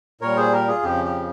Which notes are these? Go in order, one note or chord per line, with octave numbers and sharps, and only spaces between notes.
A#2 G3 A#4 C#5
G#4 C5
G4 A#4
F4 G#4
F2 C#3 F3 G4
G4